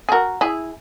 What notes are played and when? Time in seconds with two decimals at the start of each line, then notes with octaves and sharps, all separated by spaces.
0.09 G#4
0.12 F#4 A#4
0.41 E4 G#4